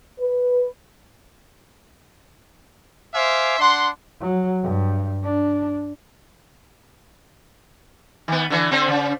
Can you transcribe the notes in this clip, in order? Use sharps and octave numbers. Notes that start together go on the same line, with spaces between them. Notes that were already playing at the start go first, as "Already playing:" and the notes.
B4
C5 E5 F5 G#5 D6
D4 F#5 C6
F#3
G2
D4
D#3 B3
D3 E3
D3 C4 C5
C#3